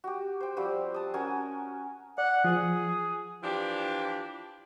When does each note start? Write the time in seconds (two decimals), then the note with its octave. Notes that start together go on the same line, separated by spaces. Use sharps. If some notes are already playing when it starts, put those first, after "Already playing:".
0.04 F#4 G4
0.40 C5 G5
0.57 F3 G3 C4 F#4
0.94 A5 D#6
1.14 C#4 F#4 A#4 G#5
2.18 D5 F#5
2.44 F3 G#4
3.43 E3 F3 D4 G4